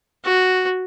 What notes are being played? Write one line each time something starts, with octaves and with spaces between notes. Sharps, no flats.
F#4